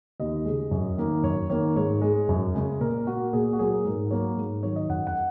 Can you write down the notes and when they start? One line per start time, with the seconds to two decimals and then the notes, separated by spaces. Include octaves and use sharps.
0.20 D#2 D#5
0.45 C#3 G#3
0.71 F#2
0.98 D#3 A#3
1.23 F#2 C#5
1.50 D#3 A#3 C#5
1.76 G#2 C#5
2.01 G#3
2.29 F#2
2.55 C#3 G#3
2.80 A#2 A#4
3.07 A#3 F#4
3.33 A#2 G#4
3.53 F#4
3.58 F#3 A#3 G#4
3.85 G#2 A#4
4.11 F#3 A#3 C#5
4.37 G#2
4.63 D#3 F#3 C#5
4.76 D#5
4.89 F#2 F#5
5.07 F#5